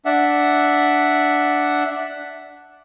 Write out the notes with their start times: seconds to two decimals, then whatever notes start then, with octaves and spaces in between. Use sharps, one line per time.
0.05 D4 E5 F#5